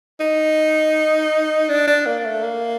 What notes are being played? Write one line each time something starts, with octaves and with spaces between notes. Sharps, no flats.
D#4
D4
D4
A#3
A3
A#3